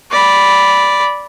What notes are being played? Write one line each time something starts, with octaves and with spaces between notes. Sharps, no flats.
D5 B5